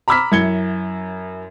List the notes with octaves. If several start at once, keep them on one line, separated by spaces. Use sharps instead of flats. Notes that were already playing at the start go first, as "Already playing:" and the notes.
A#5 B5 D6 E6 F6 B6
F#2 E4 G#6 C#7 G7